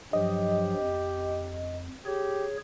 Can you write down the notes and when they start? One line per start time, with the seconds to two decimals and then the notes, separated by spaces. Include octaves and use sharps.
0.13 G2 F3 F#3 G4 D#5
0.82 F2
2.06 G4 G#4 C#5